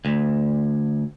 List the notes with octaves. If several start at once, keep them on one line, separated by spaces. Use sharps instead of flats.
D2